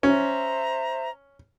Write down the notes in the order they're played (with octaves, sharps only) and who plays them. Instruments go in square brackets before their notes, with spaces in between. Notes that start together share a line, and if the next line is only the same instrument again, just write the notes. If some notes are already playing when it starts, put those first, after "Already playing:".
[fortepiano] C#4 [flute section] C5 E5 A#5